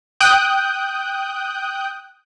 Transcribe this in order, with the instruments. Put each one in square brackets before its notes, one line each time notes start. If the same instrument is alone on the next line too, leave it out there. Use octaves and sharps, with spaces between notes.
[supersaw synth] G5 D#6 F#6 G6